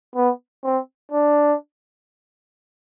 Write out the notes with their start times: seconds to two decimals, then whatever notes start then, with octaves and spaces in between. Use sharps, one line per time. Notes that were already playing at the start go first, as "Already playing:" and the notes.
0.16 B3
0.64 C4
1.11 D4